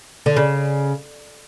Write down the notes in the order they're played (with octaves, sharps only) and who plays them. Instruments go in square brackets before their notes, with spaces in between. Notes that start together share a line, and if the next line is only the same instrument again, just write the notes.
[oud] D3
C#3